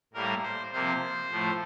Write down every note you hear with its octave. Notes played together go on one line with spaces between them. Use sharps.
A2 G3 A#3 A#4
C5
C3 F3 A#3 C5
A2 F3 A3